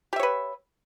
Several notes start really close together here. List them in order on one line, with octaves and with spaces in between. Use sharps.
G4 E5 C#5 B4